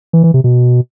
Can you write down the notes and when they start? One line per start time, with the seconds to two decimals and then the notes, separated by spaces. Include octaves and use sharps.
0.13 E3
0.24 E3
0.34 C3
0.44 B2